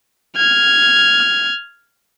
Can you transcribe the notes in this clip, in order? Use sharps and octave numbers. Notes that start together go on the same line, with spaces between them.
F6 G#6